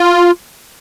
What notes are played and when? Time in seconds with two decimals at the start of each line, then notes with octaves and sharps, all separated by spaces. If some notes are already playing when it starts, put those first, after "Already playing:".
Already playing: F4